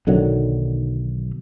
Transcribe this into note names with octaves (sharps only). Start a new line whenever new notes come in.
B1 D3 D#3 F#3